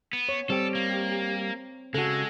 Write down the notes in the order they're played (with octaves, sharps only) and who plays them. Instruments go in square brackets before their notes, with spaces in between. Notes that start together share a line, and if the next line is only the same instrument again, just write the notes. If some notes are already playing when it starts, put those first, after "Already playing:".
[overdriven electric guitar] B3
[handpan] C#5
[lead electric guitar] G3 G4 [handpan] C4 [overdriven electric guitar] A4
[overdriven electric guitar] A#3
[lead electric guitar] C#3 F#4 [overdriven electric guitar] G#3 [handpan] A4